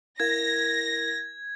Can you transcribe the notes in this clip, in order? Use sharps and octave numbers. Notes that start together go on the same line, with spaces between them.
E4 A#4 F5 G#6 A#6